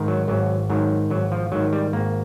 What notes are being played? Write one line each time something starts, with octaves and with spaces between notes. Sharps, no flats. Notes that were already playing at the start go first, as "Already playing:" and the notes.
Already playing: G#2 D#3
F#3
G#1 F#3
G#2 D#3 F#3
G#1 F#3
F3
G#2 D#3 F#3
G3
G#1 A#3